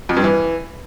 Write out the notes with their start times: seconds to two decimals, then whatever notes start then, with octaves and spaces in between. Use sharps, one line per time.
0.09 F2
0.17 G2
0.24 E3